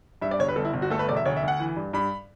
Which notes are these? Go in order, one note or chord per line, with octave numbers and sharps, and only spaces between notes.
G2 E5
D5
G1 C#5
B4
G1 A4
E4
G1
F#4
A3 A4
B4
E1 D5
E5
D2 C#5
E5
D2 F#5
E3
G2
G2 B5